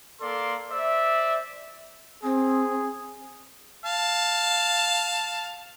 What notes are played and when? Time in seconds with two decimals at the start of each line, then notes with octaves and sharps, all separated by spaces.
0.21 A#3 A4 D5 C6
0.71 C5 D5 E5
2.23 C4 G#4
3.84 F5 A5